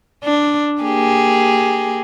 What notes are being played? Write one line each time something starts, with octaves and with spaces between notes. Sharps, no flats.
D4
A#3 G4 G#4